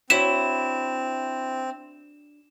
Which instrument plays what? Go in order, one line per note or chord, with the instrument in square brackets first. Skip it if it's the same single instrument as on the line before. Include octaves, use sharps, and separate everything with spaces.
[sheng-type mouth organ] C4 [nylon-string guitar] D4 F#4 C#5 [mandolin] E4 [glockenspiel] E7